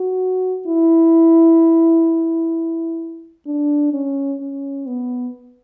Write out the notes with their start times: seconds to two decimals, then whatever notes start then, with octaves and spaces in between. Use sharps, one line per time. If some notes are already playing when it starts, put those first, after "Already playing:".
Already playing: F#4
0.67 E4
3.47 D4
3.93 C#4
4.41 C#4
4.87 B3